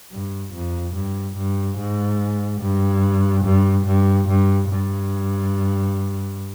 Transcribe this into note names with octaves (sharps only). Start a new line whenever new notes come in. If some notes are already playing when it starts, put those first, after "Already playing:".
G2
F2
G2
G2
G#2
G2
G2
G2
G2
G2